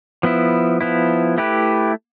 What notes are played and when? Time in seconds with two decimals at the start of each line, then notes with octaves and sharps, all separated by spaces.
0.23 F3 B3 E4
0.81 F3 B3 E4
1.38 A3 E4 G4 B4